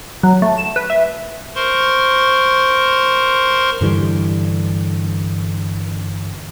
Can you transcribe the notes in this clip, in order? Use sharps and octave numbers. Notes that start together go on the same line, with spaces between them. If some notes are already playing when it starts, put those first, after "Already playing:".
F#3
A3
E7
B4
E5
A#4 C5 C6 C#6
G2 D3 E3 G3